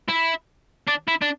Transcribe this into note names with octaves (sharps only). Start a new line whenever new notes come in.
E4
D4
E4
D4